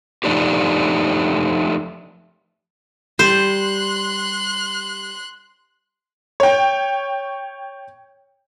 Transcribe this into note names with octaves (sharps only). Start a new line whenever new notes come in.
F3 A3 D4 D#4 G4
G3 C5 C6 F#6
C#5 G5